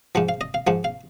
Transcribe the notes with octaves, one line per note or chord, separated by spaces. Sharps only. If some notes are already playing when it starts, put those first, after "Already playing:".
G#2 F3 F#5
F5
D#5
F5
G#2 F3 F#5
F5